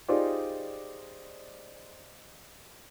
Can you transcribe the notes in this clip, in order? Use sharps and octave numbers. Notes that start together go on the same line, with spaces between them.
D#4 F4 G4 G#4 C5 D5